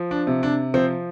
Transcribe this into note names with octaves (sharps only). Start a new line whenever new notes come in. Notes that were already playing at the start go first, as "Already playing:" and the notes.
Already playing: F3
D4
C3
D4
F3 C4